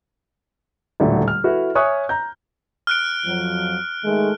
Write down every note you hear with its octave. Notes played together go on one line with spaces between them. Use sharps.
D#1 A2 D3 F#3 A3
F6
E4 F#4 A4 B4
C#5 E5 G#5 C#6 D#6 F#6
A#5 G6
F6 F#6 D7
F2 F3 F#3
D#3 G#3 A3